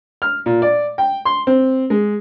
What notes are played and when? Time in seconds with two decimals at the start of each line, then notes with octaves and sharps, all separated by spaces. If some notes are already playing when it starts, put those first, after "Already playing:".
0.22 F6
0.46 A#2
0.62 D5
0.98 G5
1.25 C6
1.47 C4
1.90 G#3